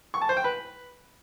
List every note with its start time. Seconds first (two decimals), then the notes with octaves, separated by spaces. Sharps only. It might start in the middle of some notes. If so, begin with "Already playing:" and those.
0.14 C#6
0.21 A5
0.29 C5
0.37 G5
0.44 B4